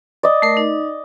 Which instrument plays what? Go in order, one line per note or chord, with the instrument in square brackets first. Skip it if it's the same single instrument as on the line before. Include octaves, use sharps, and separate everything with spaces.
[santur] D5 D#5
[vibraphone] A3 A#4
D#4